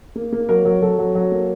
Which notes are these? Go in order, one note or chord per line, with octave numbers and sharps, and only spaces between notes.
A#3
A#3
F#3 A#4
F#3
F#3 A4
F#3
F#3
A#3